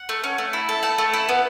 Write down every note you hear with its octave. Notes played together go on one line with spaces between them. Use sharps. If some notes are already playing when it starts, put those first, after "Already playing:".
Already playing: F#5
A3
C#4
A3
E4
A4
A3 A5
A3
E4
B3